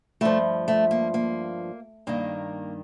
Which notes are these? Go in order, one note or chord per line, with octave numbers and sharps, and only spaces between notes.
G2 F3 A3
A3
A#3
A#3
G2 D#3 A#3